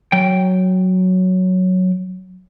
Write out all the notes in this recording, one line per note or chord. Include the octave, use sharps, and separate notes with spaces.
F#3 G5